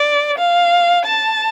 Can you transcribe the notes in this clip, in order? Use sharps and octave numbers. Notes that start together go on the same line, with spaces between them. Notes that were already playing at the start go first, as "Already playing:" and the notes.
Already playing: D5
F5
A5